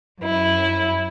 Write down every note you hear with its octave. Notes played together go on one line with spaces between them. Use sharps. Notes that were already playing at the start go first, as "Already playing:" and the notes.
F#2 E4